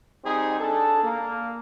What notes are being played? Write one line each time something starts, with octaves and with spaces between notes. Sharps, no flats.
G3 C4 D#4 G4 G#4
D4 G#4 A4
A#3